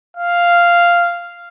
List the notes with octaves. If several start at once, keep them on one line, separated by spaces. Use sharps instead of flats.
F5